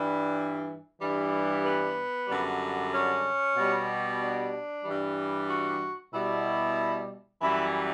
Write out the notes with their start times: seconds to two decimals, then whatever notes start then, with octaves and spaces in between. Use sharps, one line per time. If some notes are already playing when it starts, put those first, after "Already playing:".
Already playing: G2 E3 G3
1.01 G2 E3 G3
1.64 B3
2.28 F#2 D3 G3
2.93 C#4
3.56 B2 G3
4.20 D4
4.85 G2 E3 G3
5.49 F#4
6.13 B2 G3 E4
7.41 F#2 E3 G3 E4